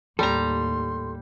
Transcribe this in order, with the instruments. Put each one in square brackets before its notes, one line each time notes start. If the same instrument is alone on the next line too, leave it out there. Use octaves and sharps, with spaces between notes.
[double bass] D#2 A2 [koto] G3 A#5 [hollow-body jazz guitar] A4 [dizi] C6